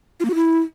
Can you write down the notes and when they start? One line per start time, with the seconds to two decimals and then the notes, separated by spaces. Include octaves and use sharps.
0.20 F4
0.25 A#3
0.30 F#4
0.35 E4